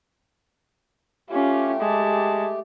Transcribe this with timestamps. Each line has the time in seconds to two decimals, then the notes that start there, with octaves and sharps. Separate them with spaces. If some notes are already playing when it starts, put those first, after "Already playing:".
1.30 A3 C#4 F4 G4
1.80 G#3 A5